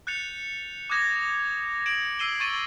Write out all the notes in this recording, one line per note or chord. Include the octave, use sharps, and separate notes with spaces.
F#6 G6 A6 C#7 F7
D6 D#6 F#6 G#6 A#6 E7
G#6 D7 E7 F#7
E6 C7 D#7 E7 G7
C#6 G#6 A6 D#7 E7